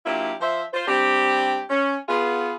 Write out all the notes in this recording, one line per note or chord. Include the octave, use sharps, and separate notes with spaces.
F#3 A#3 D4 E4 F4 G4
F3 C5 E5
F4 C5
G3 C4 D4 G4
C#4
B3 F4 G#4